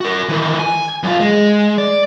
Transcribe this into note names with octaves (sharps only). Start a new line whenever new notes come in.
F#4 A#4
D#3 E3
G#5
F#2 F4
G#3
D5